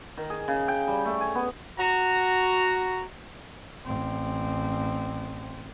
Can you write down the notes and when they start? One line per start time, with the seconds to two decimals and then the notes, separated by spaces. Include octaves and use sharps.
0.17 D#3
0.30 G#4
0.48 C#3
0.68 G5
0.88 G3
1.06 A3
1.21 G#5
1.35 B3
1.79 F#4 A#5
3.85 A1 C4